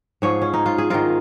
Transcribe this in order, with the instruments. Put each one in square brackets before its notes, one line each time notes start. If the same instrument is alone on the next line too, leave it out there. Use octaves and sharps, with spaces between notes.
[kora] G#2 F3 G#4 C#5
C#4
D#4
F4
G#4
G#2 D#3 F4 A#4